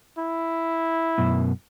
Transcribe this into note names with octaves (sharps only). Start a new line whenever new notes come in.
E4
F#2 B2